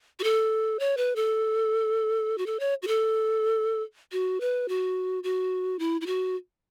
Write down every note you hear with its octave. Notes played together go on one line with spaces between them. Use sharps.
F#4
A4
C#5
B4
A4
F#4
A4
C#5
F#4
A4
F#4
B4
F#4
F#4
E4
E4
F#4